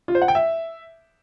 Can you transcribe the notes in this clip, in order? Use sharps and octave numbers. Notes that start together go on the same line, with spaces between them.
F4
C5
F#5
G5
E5